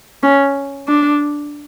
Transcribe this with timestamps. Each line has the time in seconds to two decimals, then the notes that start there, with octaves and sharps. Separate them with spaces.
0.23 C#4
0.88 D4